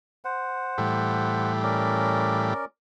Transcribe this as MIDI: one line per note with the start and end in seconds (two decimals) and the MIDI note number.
0.25 1.52 72
0.25 1.52 78
0.78 2.54 45
0.78 2.54 52
0.78 2.54 55
1.63 2.65 61
1.63 2.65 70
1.63 2.65 74